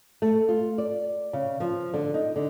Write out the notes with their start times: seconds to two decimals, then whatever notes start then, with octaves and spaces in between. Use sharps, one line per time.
0.22 A3
0.49 F4
0.78 D5
1.33 C#3
1.60 F3
1.94 D3
2.14 D#4
2.36 D3